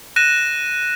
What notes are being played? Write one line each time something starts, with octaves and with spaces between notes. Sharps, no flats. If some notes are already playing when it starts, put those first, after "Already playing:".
F#6 A#6 D#7 E7